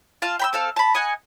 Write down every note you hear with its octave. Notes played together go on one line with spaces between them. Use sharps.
F4 F5 A5
G5 B5 E6
C4 A4 F5
A5 B5
D#5 F#5 G#5